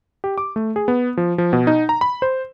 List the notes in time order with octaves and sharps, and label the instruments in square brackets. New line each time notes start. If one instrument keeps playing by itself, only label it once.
[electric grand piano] G4
D6
A3
G#4
B3
F3
F3
B2
D#4
A#5
B5
C5